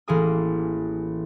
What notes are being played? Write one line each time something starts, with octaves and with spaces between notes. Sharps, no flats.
A1 E3 A#3 G#4 G#5 D#6